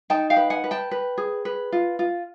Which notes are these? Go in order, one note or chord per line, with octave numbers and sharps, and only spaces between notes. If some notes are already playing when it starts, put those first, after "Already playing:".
D#4 G5 A5
F5 G5
B4
F#5 G#5
B4
G5 A5
B4
G#4
B4
F4
F4